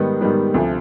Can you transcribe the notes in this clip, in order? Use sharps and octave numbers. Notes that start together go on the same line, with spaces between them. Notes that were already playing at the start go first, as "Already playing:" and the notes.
Already playing: G#2 D#3 G3 B3
G#2 D#3 G3 B3
D2 C3 F3